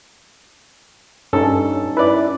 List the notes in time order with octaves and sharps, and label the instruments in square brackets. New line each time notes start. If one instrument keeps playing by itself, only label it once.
[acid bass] G2 [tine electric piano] C#4 D#4 [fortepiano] A4
[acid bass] E4 [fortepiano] B4 D5